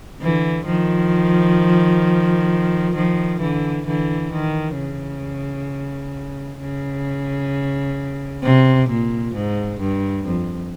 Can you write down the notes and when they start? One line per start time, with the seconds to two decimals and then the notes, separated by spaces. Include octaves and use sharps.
0.21 D3 E3
0.66 D#3 F3
2.95 D#3 F3
3.40 D3 E3
3.87 D3 E3
4.32 D#3
4.78 C#3
6.61 C#3
8.43 C3
8.90 A#2
9.34 G#2
9.80 G2
10.26 F2